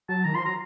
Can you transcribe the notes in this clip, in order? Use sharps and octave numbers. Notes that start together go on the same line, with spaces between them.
F#3 A5
D#3 A#5
F3 C6
F#3 A#5